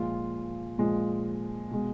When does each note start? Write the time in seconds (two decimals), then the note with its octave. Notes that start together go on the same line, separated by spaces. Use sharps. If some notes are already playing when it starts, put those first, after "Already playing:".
Already playing: A#2 F3 G#3 F4
0.78 A#2 F3 G#3
1.71 B2 G#3